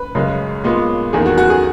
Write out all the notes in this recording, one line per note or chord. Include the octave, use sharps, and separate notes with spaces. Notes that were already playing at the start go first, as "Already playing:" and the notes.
Already playing: B4
F#2 C#3 G#3
A#2 G#3 B3
E2 D#3 A#3 G#4
F#4
F#4
G#4